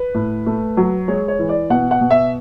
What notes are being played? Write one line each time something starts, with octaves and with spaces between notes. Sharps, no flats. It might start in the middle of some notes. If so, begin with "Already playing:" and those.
Already playing: B4
A2
A3
F#3
G#3 C#5
C#5
E3
D5
B2 F#5
F#5
B2
E5